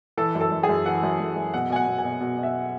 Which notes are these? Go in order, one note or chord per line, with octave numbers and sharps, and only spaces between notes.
E3 A4
F#2
A4
F#2
G#4
F#2
E3 F#5
F#2
F#2
F#2
B2 F#5
B2 G#5
F#5
B2
G#5
B2
B2
B2
E5